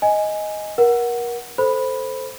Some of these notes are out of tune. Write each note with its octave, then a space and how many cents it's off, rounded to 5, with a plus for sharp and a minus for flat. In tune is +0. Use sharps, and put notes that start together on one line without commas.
D#5 +5 G#5 +0
A#4 +30 F#5 +0
A4 +0 C5 +0 B5 +0